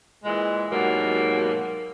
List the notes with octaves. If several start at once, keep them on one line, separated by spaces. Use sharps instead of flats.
A#2 E3 G#3
G#2 B2 F#3 G3 A#3